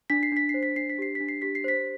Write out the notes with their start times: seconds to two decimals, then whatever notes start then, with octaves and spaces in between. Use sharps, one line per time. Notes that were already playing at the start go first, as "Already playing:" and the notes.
0.10 D4 B6
0.23 C7
0.32 D4 B6
0.49 C7
0.54 C5
0.63 B6
0.76 D4 C7
0.90 B6
0.98 G4 C7
1.15 B6
1.20 D4
1.29 C7
1.42 G4 B6
1.55 C7
1.64 C5 B6